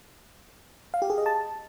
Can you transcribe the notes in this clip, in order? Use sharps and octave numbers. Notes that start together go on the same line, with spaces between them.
F5
G4
G#4
D#5
A5